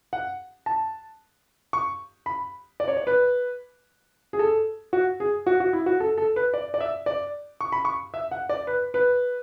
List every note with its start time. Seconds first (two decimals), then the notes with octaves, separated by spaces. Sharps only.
0.13 F#5
0.66 A5
1.73 C#6
2.26 B5
2.80 D5
2.88 C#5
2.97 D5
3.07 B4
4.33 G#4
4.39 A4
4.93 F#4
5.20 G#4
5.47 F#4
5.60 F#4
5.73 E4
5.86 F#4
6.00 A4
6.18 A4
6.36 B4
6.54 D5
6.74 D5
6.81 E5
7.06 D5
7.61 C#6
7.72 B5
7.85 C#6
8.14 E5
8.31 F#5
8.49 D5
8.67 B4
8.94 B4